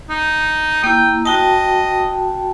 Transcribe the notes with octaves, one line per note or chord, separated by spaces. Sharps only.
D#4
A#3 E4 G5
F#4 D#5 G5 A5